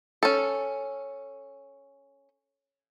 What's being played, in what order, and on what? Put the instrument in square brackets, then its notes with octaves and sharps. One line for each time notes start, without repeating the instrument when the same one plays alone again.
[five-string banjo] C#4 A4